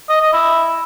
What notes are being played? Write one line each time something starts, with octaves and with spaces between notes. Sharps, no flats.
D#5
D#5
E4